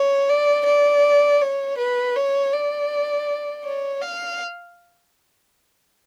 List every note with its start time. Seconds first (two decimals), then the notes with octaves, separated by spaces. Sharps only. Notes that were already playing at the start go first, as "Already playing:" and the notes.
Already playing: C#5
0.29 D5
0.66 D5
1.41 C#5
1.78 B4
2.16 C#5
2.53 D5
3.65 C#5
4.01 F5